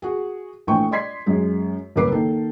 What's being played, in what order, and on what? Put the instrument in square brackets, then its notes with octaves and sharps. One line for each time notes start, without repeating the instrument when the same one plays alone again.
[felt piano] F#4 G#4
A#1 E3 A3 G5 G#5 C#6
D5 D#5 C6 G#6 B6 C7
F#2 G#3
F#1 C2 A#4 B4 D6 C7
D#3 A#3 A4